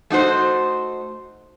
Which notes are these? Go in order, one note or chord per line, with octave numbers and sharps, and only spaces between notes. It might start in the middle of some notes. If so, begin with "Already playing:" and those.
A3 D#4 F#4 C5